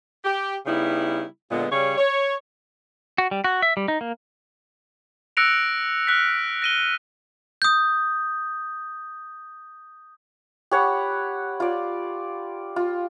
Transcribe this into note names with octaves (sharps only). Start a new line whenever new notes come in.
G4
C#3 G3 B3 D#4 E4
A#2 D3 G#3 B3
C#3 G3 C#5
C#5
F#4
G3
F#4
E5
G3
D#4
A#3
E6 F#6 A#6 C#7 D7 F7
F6 F#6 B6
A#6 D#7 G7
D#6 G6
G4 C#5 F#5 B5
F4 D5
F4